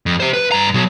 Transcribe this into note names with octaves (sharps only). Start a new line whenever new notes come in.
F2
G4 C5
B4
G2 A#5
B2 F#3